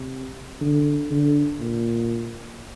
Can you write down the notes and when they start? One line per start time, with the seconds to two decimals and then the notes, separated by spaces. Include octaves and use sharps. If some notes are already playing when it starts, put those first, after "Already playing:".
Already playing: C3
0.61 D3
1.11 D3
1.60 A#2